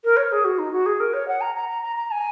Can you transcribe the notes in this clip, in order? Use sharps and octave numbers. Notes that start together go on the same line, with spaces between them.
A#4
C#5
G#4
F#4
D#4
F#4
G#4
A#4
C#5
F#5
A#5
A#5
A#5
A#5
A#5
G#5